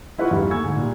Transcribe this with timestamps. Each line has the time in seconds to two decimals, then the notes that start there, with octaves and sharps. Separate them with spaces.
0.18 E4 F4 B4 D#5 F#5 C#6
0.31 E2 G2 G3 D#4 F5
0.50 A3 A#3 G#5 C#6 E6 G#6
0.62 D2 G#2
0.77 A#2 G3